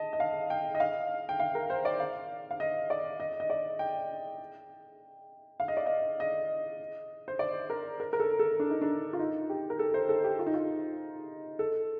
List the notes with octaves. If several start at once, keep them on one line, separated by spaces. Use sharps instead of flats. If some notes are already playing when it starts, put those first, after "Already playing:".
Already playing: D#5 A5
D#5
F5
G5
D#5
F5
G5
F5
A#4
C5
D5
F5
F5
D#5
D5
D#5
D#5
D5
G5
F5
D#5
D5
D#5
D#5
C5
D5
A#4
A#4
A#4
A4
A4
D4
D#4
D4
F4
D#4
G4
A#4
A4
C5
A4
G4
F4
D#4
F4
A4